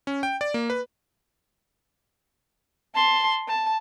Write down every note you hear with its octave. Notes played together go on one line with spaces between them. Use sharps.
C#4
G5
D5
A#3
B4
A5 C6
A5